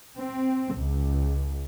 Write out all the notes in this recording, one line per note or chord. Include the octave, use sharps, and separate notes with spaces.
C4
C#2